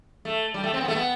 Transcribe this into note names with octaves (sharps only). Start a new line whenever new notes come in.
A3
G3
A3
C4
B3
A3
B3